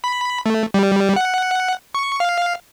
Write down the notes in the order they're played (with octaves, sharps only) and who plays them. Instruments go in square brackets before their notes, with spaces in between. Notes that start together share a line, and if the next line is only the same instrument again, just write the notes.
[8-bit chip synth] B5
A3
G3
F#5
C#6
F5